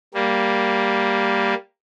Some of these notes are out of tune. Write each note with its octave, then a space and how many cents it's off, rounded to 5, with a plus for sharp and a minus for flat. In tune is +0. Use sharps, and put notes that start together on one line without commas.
G3 +0 A#3 +0